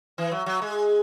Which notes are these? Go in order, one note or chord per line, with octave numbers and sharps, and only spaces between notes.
E3
F#3
F#3
G#3